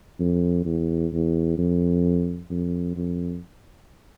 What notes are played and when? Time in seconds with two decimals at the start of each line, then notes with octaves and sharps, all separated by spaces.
0.20 F2
0.65 E2
1.13 E2
1.58 F2
2.50 F2
2.96 F2